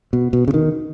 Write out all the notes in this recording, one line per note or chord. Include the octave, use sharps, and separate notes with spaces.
B2
B2
C#3
D#3